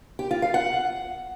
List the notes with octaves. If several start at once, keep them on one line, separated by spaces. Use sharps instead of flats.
G4
F4
F5
F#5